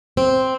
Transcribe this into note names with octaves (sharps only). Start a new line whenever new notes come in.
C4